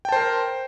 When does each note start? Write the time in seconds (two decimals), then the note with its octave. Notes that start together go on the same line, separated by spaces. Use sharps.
0.05 G5
0.09 A5
0.12 C5
0.16 A#4